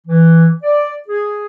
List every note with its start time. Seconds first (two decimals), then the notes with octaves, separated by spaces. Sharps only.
0.07 E3
0.63 D5
1.09 G#4